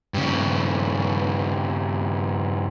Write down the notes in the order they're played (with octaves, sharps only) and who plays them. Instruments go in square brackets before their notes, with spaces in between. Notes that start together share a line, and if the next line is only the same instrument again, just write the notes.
[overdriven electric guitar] G2 C#3